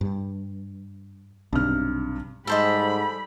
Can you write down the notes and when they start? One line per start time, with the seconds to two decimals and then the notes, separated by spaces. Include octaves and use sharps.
0.01 G2
1.53 B1 G2 C3 F6
2.47 G#2 G3 A4 C5 D#5 B5